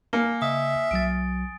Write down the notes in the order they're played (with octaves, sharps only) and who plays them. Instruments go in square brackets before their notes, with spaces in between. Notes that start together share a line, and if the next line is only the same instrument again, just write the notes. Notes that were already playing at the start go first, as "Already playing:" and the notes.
[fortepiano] A#3 [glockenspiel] G#5 C#7 G7
[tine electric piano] C#3 D#5 [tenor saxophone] E5 [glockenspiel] D#6
[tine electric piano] B1 F#3 [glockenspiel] A6 D7